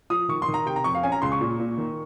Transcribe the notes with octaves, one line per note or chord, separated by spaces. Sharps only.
F3 D#6
D#3 C#6
C6
D#3
A#5
C3 G5
A#5
F2 C#6
F5
C#4 G#5
A#5
C#2 C6
C#6
A#2
A#2
D#3